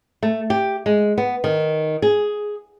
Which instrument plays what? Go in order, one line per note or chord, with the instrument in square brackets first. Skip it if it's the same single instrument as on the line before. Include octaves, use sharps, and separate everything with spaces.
[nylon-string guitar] A3
G4
G#3
B3
D#3
G#4